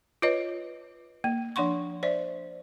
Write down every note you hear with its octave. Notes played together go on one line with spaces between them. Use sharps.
F4 B4 C#5 D#5
A#3
F3 D4 F#5 C6 C#6
C5 D5 E5